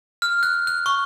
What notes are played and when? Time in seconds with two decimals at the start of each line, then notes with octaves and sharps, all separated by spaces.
0.22 F6
0.43 F#6
0.67 F#6
0.86 C#6